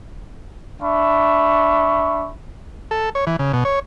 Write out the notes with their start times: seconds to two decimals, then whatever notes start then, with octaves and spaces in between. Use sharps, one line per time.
0.82 D4 E5 B5 C#6
2.91 A4
3.15 C#5
3.27 E3
3.39 C#3
3.53 B2
3.65 C#5